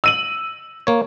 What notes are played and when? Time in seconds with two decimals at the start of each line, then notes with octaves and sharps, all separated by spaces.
0.04 E6 D#7 F#7
0.87 A#3 C#5